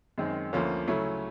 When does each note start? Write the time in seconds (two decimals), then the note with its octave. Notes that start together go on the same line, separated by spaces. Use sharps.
0.18 F#2 D#3 G#3 C4
0.53 D2 D3 F3 A#3 C#4
0.87 C#3 F#3 A3 C#4 E4